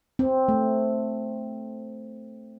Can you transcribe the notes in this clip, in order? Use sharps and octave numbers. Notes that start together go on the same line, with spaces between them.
C4
A3